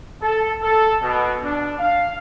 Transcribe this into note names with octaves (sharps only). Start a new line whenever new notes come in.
A4
A4
B2
D4
F5